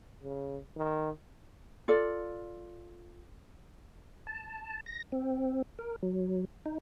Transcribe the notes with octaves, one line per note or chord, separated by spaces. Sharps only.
C#3
D#3
F4 A4 D5
A5
A#6
C4
A#4
F#3
D#4